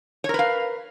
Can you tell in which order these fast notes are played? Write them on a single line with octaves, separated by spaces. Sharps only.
C#5 A#4 B4 F5